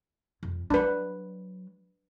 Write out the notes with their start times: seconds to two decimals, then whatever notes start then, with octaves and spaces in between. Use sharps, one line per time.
0.43 F2
0.70 F#3 D4 B4